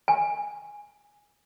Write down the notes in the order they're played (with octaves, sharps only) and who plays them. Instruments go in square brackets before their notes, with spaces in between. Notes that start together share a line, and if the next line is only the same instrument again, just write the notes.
[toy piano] G#5